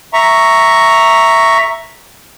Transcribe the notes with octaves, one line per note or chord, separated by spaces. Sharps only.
E5 A#5 C#6